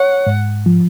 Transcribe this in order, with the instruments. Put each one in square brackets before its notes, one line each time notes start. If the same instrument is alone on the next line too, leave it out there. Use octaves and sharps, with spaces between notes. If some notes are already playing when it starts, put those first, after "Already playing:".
Already playing: [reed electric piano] C#5 [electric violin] F#5
[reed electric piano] G#2
F3